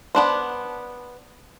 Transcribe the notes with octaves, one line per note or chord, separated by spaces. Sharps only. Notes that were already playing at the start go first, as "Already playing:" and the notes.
B3 D4 C5